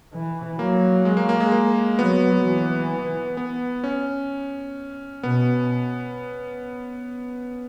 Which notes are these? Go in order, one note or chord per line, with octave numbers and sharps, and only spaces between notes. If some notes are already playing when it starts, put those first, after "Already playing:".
E3
F#3 A#3
G#3
A#3
A#3
G#3
A#3
F#3 B3
E3
B3
C#4
B2 B3